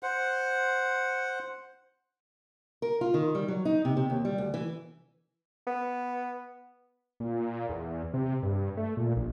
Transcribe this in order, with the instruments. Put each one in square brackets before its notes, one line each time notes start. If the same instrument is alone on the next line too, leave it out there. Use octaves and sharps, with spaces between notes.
[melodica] C5 F#5
[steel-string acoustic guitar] A#4
F4
D#3
G3
F#3
D#4
C3
C3
D#2
G3
D2
E3
[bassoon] B3
[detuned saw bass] A#2
E2
C3
G2
A3
A#2
A#1